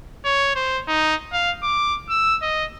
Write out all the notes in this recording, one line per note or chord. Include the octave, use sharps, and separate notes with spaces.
C#5
C5
D#4
F5
D6
E6
D#5